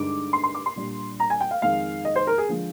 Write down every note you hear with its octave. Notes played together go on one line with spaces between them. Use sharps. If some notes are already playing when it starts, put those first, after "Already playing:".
Already playing: G2 D3 G#3 D#4 D6
C6
C6
D6
C6
A#2 G3 D4
A#5
G#5
G5
F5
F2 D#3 G#3 F5
D#5
C5
A#4
G#4
D3 F3 G#3